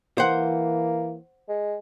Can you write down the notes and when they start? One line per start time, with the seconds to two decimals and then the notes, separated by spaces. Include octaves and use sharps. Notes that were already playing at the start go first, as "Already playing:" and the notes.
0.18 E3 A#3 C5 F#5
1.49 G#3